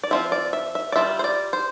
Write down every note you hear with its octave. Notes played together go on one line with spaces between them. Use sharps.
D5
F3 C4 F4 E5
D5
E5
E5
D5
G3 D4 F4 E5
C5
D5
C5